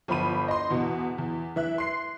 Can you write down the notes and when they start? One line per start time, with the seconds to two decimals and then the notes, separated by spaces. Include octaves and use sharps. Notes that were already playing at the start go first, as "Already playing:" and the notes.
0.08 G1 F3 B5 D#7
0.48 D#5 C6
0.70 E2 B2
1.18 E2
1.56 E3 E5 F#6
1.78 C6 C7